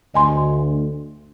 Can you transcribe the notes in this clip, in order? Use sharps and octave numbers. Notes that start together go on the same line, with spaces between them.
D2 D#5 G#5 C6